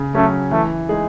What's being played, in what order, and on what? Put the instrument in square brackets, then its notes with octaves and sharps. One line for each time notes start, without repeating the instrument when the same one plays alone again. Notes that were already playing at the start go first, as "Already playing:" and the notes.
Already playing: [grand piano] C#3
[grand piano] F#3 C#4 G#4 [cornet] A3
[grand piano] E3 [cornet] A3
[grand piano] G#3 D#4 G#4